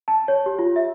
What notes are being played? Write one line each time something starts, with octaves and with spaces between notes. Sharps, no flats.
A5
C#5
G4
F4
E5